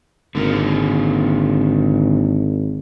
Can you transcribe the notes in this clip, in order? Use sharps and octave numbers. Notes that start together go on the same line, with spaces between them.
G#1 D3 A#3